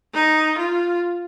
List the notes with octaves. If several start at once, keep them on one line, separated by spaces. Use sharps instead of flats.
D#4
F4